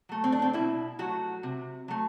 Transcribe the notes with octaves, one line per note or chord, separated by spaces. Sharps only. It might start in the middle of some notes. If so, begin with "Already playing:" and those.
F#3 A3
C4
D4
C4
B2 E4
F#3 A3 F#4
C3
F#3 A3